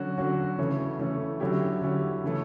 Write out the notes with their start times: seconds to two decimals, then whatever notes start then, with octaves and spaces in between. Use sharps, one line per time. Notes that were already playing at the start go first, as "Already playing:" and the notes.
Already playing: D3 F#3 C#4 F#4
0.17 D3 F#3 C#4 F#4
0.58 C#3 E3 A3 C#4
0.99 C#3 E3 A3 C#4
1.40 D3 F#3 C#4 E4 G4
1.81 D3 F#3 C#4 E4 G4
2.24 C#3 E3 A3